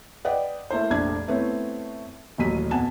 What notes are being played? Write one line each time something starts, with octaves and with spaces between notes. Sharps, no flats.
B4 D5 D#5 F#5 G5
A3 A#3 E4 C5
F1 A#1 D4 G#6
A3 B3 C4 E4 C#5
D#1 A1 A#2 F#3 B6 D#7
F2 B2 F#5 G#5 A5 E7